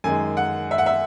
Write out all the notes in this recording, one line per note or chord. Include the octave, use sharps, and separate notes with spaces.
F#2 D#3 G#3 G#5
F#5
E5
F#5
E5